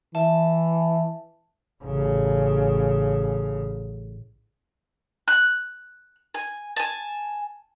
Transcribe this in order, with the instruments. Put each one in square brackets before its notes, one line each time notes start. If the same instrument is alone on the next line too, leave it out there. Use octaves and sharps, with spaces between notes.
[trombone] E3 [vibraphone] E5 A5
[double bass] A1 C#3
[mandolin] F#6
G#5
G#5 A5